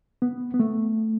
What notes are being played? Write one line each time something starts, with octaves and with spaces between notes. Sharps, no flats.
B3
B3
A3